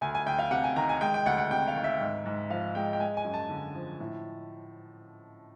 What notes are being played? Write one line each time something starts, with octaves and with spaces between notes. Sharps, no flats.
D2 G#5
G#5
D2 G5
F5
C3 F#5
G#5
D#3 A#5
G#5
G#3 G5
G5
D2 F#5
F#5
C3 G5
F5
D#3
E5
G#2
G#2
F3 F5
G#3 G5
G5
G#3 G#5
G#5
F#2
A5
D3
F3
A2